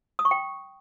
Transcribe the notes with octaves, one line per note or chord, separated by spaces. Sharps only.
D#6
C#6
G5